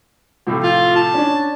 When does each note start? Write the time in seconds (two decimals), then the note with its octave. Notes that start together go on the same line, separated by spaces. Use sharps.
0.47 A2 C3 F3
0.64 F4
0.96 A5
1.14 C#4 D4